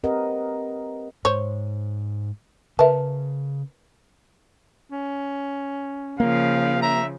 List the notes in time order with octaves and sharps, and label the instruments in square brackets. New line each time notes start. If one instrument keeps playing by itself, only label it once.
[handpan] C4 G4 A#4 B4 D#5 F#5
[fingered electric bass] G#2 [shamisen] C5 C#5
[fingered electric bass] C#3 [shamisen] A#4 A5 [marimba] B4 E5
[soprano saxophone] C#4
[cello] C#3 F3 [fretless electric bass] A#3 [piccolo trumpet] F5
[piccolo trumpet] E5 [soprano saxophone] A#5